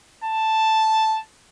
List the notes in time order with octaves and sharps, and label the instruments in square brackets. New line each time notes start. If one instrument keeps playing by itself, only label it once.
[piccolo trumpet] A5